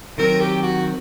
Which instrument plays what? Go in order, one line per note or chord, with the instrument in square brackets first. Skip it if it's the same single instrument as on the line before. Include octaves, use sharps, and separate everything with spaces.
[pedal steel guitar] D#3 F#3 C4 [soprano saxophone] A#4
[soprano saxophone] G4
F#4